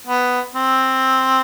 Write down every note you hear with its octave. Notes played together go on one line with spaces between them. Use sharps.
B3
C4